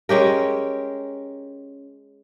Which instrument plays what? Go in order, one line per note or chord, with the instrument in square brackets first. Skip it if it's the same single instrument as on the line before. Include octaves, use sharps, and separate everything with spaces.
[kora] G#3 C#4 G4 A#4